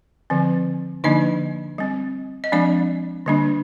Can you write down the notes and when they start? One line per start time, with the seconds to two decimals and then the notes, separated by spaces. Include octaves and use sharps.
0.30 D3 F3 C4
1.04 D3 F3 A#3 D4 D#4 D#5
1.78 G3 C4
2.44 D#5
2.52 F3 G#3 C4 D4 D5
3.26 D3 G3 A#3 D4